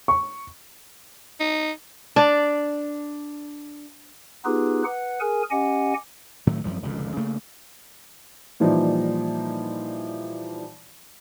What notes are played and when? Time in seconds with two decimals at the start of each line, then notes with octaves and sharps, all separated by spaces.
0.08 C#6
1.40 D#4
2.16 D4 D5
4.45 B3 D#4 F4 G4 G#4 B4
4.84 B4 F#5
5.20 G#4 A#4 G#5
5.51 C#4 G4 D#5 F#5 G#5
6.47 A2 D#3 F#3 A3
6.64 G#1 F#2 F3 G3
6.82 F1 C#2 A#2 D3
7.17 C#3 A3 A#3
8.60 A#2 E3 F3 G3 D#4